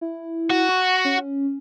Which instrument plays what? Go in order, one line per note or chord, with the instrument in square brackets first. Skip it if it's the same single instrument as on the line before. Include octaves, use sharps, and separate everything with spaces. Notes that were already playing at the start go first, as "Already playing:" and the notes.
[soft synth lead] E4
[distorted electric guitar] F#4
[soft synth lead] C#6
C#4